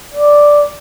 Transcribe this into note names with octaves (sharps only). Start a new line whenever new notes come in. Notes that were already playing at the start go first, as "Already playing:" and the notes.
D5